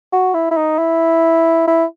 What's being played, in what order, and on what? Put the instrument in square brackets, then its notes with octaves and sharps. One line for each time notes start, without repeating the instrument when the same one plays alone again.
[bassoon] F#4
E4
E4
D#4
E4
E4